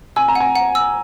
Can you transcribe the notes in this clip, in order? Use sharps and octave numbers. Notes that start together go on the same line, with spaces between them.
G#5 E6
A#5
F#5
G#5
F#5
E6